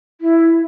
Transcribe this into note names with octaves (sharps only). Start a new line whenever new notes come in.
E4